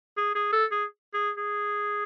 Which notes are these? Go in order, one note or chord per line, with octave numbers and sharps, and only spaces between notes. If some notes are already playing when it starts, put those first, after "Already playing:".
G#4
G#4
A4
G#4
G#4
G#4